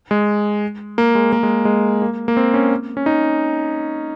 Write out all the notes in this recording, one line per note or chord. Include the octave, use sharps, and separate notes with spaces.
G#3
A#3
G#3
A#3
G#3
G#3
A#3
A#3
C4
C#4
C#4
D#4